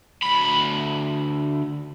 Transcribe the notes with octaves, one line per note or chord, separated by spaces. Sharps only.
D2 B5